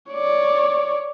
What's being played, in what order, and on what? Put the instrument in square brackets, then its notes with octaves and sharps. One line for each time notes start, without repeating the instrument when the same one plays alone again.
[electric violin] C#5 D5